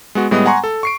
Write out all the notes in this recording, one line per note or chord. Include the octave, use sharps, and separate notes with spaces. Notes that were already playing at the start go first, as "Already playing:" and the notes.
G#3 B3 F#4
A2 G3 G#3 B3 D#5 D#6
F#5 G#5 A#5 C6 C#6
A4
C#6 C7 D7